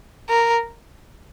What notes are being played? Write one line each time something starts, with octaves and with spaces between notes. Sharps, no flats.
A#4